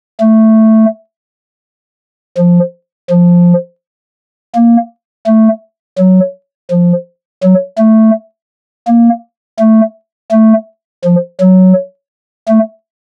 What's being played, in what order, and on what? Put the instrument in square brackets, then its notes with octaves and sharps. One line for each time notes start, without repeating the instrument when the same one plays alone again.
[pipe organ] A3
F3
F3
A#3
A3
F#3
F3
F#3
A3
A#3
A3
A3
F3
F#3
A3